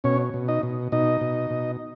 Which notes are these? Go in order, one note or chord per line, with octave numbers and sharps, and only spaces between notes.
B2 C#4 C#5
B2
D#4 D#5
B2
B2 D#4 D#5
B2
B2